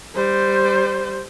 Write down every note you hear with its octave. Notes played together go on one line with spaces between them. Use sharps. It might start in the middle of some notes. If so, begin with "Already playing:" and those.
G3 C5